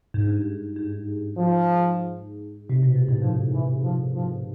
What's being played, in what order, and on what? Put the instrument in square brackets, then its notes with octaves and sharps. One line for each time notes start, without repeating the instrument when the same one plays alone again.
[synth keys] G#2
G2
G#2
G#2
[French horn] F3
[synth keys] C3
B2
A#2
A2
[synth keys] G#2 [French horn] F3
[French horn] E3
F3
F3